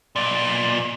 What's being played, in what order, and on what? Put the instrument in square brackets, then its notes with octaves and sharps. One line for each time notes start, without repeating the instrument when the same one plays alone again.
[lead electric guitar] B1 A#2 [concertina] D5